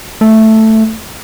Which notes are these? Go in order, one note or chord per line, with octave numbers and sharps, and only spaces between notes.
A3